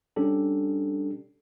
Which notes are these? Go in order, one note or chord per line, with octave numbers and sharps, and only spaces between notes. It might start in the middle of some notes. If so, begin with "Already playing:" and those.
G3 C#4 D4 G4 A4